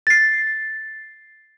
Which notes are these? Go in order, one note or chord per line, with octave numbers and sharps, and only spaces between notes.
A6 C7